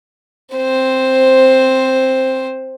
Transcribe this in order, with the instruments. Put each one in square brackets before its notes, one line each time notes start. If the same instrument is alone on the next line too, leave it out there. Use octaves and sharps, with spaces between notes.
[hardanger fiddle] C4 C5